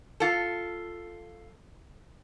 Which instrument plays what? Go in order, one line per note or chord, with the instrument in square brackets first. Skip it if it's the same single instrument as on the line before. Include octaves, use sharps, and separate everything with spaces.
[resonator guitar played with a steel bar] F4 A4